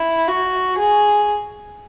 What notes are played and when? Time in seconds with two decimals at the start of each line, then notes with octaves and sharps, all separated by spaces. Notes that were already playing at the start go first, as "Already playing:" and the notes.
Already playing: E4
0.28 F#4
0.78 G#4